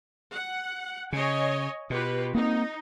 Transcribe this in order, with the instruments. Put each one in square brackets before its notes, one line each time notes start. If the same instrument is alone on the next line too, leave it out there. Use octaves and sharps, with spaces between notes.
[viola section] F#5
[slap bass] C#3 [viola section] C#5 D#5 G#5
[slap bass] B2 [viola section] F4 G4 B4
[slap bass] A#3 C4 [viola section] D#4